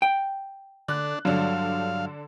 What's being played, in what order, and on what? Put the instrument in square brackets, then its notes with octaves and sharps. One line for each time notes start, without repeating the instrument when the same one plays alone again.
[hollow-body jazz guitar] G5
[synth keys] D3 [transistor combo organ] D4 [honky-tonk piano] F#6
[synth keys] G2 F#3 [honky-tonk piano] D3 D4 A4 [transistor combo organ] F5